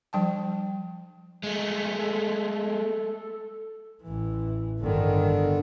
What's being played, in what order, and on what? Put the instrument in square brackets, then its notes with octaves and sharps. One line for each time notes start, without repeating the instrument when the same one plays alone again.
[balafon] F3 G3 G5 A5
[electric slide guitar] G#3 A3
[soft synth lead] A4
[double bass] A1 E3
[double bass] G1 D#3 [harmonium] D3